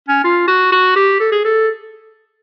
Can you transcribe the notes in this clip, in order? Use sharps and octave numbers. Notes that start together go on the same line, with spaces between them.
C#4
F4
F#4
F#4
G4
A4
G#4
A4